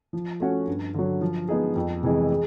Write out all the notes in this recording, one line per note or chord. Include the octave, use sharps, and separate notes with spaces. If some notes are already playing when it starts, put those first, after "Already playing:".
F3
A3 C#4 F#4
G2
D3 F#3
F3
G#3 B3 D#4 G#4
F2
C3 E3 G#3
G#3